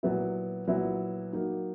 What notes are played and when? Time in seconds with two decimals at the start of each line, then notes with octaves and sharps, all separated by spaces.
0.03 A#2 F#3 B3 E4
0.67 A#2 F#3 B3 E4
1.33 F#3 A#3 D#4 F#4